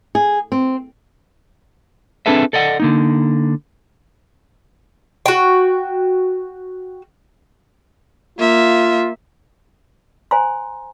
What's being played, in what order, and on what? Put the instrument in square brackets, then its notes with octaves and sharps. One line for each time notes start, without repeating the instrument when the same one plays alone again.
[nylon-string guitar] G#4
C4
[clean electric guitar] C4 D4 G#4 A4 B4 E5
A4 D5 D#5 F#5
D3 A#3 D#4
[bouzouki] F#4 G5
[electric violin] A#3 E5 [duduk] F4
[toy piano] C5 G#5 A#5 C6